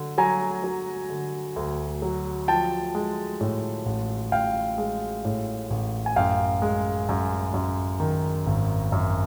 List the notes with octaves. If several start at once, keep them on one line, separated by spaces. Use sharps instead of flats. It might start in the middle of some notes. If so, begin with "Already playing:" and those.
Already playing: D3 F#3
F#3 G#5 A#5
F#3
D3
D2
F#3
F3 G5 A5
G#3
A2
A1
A1 F5 G5
G#3
A2
A1
G#5
F#2 F5 G5
G#3
F#2
F#2
D#3
G#1
F#2